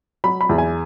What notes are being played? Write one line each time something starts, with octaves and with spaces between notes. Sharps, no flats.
F#3 B5
B5
E2
G#5